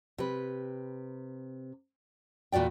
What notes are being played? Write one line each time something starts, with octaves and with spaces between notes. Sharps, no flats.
C3 B4
E2 A#2 F#4 D5 G5